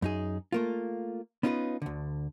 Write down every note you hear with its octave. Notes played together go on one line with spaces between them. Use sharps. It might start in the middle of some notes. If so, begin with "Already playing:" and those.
F#2 D#4 G#4
A3 A#3 F4
B3 C#4 D#4 F4 A#4 B4
D2 D3